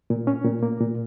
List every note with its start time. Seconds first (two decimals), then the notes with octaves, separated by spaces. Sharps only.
0.10 A#2
0.27 C#4
0.45 A#2
0.63 A#3
0.80 A#2